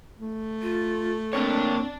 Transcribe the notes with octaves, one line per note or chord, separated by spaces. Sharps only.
A3
F4
A#3 C4 D4 C#5